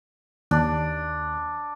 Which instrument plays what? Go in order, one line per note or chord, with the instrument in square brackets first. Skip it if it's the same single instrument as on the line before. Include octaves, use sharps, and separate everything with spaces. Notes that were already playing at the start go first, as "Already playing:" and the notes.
[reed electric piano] D#2 [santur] D4